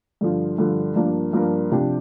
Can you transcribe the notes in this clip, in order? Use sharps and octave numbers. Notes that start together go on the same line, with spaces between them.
G2 D3 F3
G2 D3 F3
G2 F3 A#3 D4 A#4
G2 F3 A#3 D4 A#4
C3 F3 D4 G4